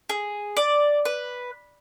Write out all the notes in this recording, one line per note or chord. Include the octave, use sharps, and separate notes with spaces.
G#4
D5
B4